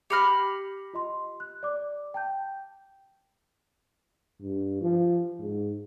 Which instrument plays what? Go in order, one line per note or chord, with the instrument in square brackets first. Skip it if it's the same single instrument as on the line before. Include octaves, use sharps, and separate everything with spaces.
[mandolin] G4 B5 F6 [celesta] A#6 C7 C#7
[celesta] F4 D#5 C6
F#6
D5 D6
G5 A5 G6
[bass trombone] G2
F3
G#2